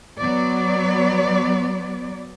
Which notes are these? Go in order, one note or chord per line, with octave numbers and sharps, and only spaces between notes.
F#3 B3 D5